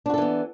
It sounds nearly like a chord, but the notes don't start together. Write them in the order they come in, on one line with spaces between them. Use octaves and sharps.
D4 F#4 A4 E3 B3